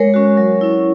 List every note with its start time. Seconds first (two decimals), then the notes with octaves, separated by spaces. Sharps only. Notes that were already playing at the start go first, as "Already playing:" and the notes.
Already playing: G#3 A#4 C#5
0.14 C#4 F#4
0.37 F#3
0.61 C#4 E4